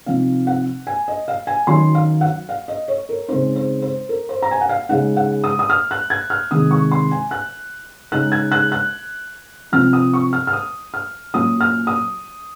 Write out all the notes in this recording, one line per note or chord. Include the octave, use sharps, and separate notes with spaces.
C3 F3 C4 D#4 F5
F#5
G#5
D#5
F5
G#5
D#3 F#3 C#4 C6
F5
F#5
F5
D#5
C#5
A#4
C#3 G#3 C4 D#4 C5
C5
C5
A#4
C5
A#5
G#5
F#5
F5
C#3 G#3 D#4 F#5
F#5
D#6
D#6
F6
F#6
G#6
F6
C3 D#3 G#3 D#6
C#6
C6
G#5
F#6
C#3 G#3 D#4 F#6
G#6
F#6
F#6
C3 F3 C4 F6
D#6
C#6
F6
F6
D#6
F6
A#2 F#3 A#3 C#4 D#6
F6
D#6